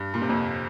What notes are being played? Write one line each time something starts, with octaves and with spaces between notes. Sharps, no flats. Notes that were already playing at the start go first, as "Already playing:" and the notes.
Already playing: G2
A#2
C3
F2 A#2